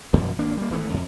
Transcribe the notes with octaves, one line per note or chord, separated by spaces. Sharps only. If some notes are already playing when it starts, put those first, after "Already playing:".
G#1 F#2 B2 F3
G#1 A#3 D4
G3 A#3
G#1 E3 A3 B3
F2